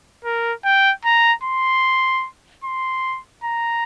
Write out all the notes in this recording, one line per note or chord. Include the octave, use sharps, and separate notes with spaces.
A#4
G5
A#5
C6
C6
A#5